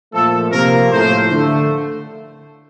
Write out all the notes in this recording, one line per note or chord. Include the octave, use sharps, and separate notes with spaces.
A#2 F3 A3 A4
C3 F3 A#3 A#4
A2 F3 A3 C5
D3 A3